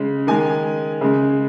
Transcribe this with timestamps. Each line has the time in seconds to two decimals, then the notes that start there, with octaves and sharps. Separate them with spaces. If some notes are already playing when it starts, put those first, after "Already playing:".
Already playing: C#3 G#3
0.27 D#3 G#3 G#5
1.01 C#3 G#3